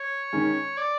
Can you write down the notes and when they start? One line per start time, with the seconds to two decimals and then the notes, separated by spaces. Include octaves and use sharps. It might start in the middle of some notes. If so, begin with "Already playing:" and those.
Already playing: C#5
0.33 D#3 G#3 C#4
0.77 D5